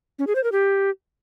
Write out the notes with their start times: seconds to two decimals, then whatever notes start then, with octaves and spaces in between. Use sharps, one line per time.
0.19 C#4
0.27 G#4
0.35 C5
0.44 A#4
0.52 G4